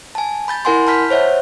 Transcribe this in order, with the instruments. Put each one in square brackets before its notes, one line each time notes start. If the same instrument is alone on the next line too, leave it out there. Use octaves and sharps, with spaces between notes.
[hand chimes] G#5 A5
B5 G6 A6
E4 A#4 F#5 G#5 C6
A5 B5 F6 G6 B6
C5 C#5 E5 F#5